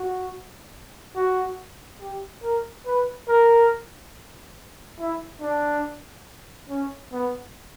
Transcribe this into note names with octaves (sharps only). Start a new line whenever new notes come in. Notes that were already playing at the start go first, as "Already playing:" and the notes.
Already playing: F#4
F#4
G4
A#4
B4
A#4
E4
D4
C#4
B3